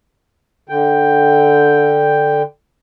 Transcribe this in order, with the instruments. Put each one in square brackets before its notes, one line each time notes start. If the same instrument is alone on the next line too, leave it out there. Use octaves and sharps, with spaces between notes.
[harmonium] D3 G5